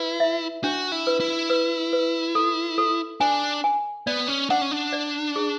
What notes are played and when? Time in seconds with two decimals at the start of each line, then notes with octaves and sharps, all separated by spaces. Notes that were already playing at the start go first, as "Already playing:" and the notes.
Already playing: E4 B4
0.20 E5
0.64 D4 F#4
0.92 E4
1.07 B4
1.20 E4
1.50 B4
1.93 B4
2.35 A4
2.78 A4
3.20 D4 G#5
3.64 G#5
4.07 B3 D5
4.28 C#4
4.50 D4 F#5
4.62 C#4
4.71 D4
4.93 D5
5.36 G#4